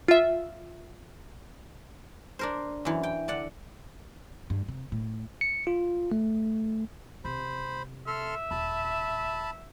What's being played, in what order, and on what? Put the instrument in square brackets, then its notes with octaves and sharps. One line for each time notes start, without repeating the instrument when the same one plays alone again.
[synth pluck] F4 E5
[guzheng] D4 A#4 C5
F#2 E3
G5
D3 D5 F#5
[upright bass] G2
C3
A2
[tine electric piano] C#7
F4
A3
[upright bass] C3 [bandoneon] C5 B5
[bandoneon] A4 C6 F6 [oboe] E5
[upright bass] D#1 [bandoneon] A5 B5